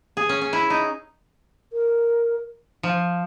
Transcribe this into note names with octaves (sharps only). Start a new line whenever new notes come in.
G#4
C#4
C#4
E4
D#4
A#4
F3